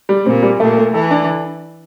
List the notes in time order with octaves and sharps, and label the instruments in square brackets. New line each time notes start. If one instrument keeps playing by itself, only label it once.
[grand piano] G3
[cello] A#2 [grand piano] C4
[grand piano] G3
[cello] A#2 [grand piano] A3
[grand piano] A3
[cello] E3 [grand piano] A4
[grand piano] D4